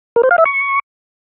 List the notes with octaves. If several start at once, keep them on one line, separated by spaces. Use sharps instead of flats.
A#4
C5
F5
E5
C#6